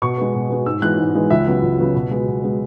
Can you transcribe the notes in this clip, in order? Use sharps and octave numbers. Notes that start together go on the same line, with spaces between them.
B2 C#6
G#3 B3
B2
G#3 B3
G#2 E6
E3 G#3 B3 F#6
G#2
E3 G#3 B3
C#2 E5
C#3 F#3 B3
C#2
C#3 F#3 B3
B2
G#3 B3
B2
G#3 B3